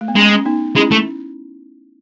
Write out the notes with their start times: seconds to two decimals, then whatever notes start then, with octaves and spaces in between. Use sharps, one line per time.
0.01 A3
0.08 B3
0.15 G#3 C#4
0.35 C#4
0.45 B3 D#4
0.76 G#3 C#4 E4
0.91 A3